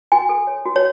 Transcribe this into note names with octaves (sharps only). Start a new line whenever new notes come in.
F#4 G#5
A4
C#5
F#4
C#5